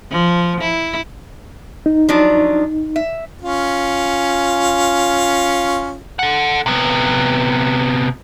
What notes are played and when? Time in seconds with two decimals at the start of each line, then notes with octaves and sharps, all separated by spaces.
0.11 F3
0.61 E4
1.86 D#4
2.09 F3 F#3 D4
2.96 E5
3.42 C#4 F4
6.19 A4 F#5
6.66 C3 B3